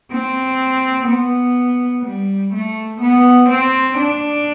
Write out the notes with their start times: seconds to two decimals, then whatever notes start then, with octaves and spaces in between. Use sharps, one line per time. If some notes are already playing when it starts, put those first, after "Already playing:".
0.12 C4
1.08 B3
2.05 G3
2.53 A3
3.00 B3
3.49 C4
3.97 D4